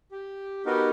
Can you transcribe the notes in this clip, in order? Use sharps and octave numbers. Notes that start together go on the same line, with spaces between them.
G4
B3 D#4 F#4 G4 A#4